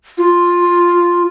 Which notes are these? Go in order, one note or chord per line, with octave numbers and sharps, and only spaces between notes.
F4